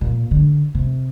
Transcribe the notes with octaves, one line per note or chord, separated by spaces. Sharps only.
A#2
D3
C3